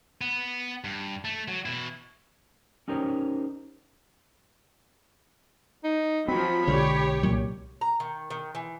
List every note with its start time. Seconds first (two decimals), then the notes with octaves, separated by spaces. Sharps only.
0.21 B3
0.84 G2
1.25 A3
1.48 F#3
1.66 B2 E4
2.88 C#4 D#4 G4 A#4 C5 C#5
5.84 D#4
6.28 F3 F#3 C4 B5
6.67 B1 B2 D3 G#3 G4 C#5
7.23 C2 A#2 F#3
7.81 A#5
8.00 D#3
8.30 D#3
8.55 E3